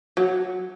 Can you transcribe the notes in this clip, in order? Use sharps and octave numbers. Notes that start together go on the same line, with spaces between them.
F#3